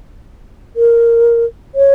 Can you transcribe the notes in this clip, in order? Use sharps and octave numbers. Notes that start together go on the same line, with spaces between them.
A#4
C#5